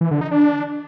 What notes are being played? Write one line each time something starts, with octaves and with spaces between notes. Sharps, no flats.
E3
D3
D#4
D4